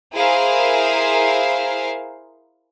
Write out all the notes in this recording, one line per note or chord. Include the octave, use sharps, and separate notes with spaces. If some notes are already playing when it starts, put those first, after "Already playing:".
E4 G#4 A#4 C5 F5